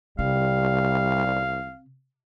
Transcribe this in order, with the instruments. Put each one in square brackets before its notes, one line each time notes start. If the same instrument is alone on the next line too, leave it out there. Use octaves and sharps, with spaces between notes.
[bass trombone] C2 [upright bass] C3 [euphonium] G3 [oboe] F5